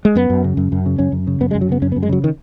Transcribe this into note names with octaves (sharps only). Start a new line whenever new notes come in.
G#3
F#2 B3
F#2
C#3
F#2
F#2
C#3
F#2 C#4
F#2
C#3
F#2 B3
G#3
F#2
F#3
C#3 B3
F#2 C#4
B3
F#2
G#3
C#3 F#3
D#3